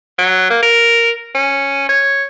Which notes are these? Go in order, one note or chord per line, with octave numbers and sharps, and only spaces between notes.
F#3
A#3
A#4
C#4
C#5